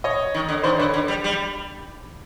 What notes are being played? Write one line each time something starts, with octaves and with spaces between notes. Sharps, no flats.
C#5 D#5
D#3
D3
D#3 C5 D5
D3 B4 C#5
D3
G3
G3